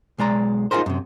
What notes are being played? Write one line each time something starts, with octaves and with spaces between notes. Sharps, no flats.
B1 G#3 D5 A#5
D#4 F4 F#4 G#4 A#4 C5
F#2 C3